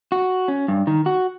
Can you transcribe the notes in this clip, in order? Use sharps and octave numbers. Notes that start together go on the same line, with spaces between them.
F#4
C#4
G2
D#3
F#4